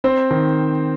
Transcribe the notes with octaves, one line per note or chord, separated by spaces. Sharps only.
C4 C5
D#3